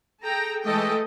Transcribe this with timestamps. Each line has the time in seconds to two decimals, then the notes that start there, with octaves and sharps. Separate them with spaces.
0.24 G#4 A4 G5 A#5
0.64 E3 G#3 A3 A4 D#5 G5